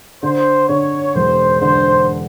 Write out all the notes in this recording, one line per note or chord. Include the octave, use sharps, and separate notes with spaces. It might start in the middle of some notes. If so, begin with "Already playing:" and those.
D3 C5
D3 C#5
E1 C5
D3 C5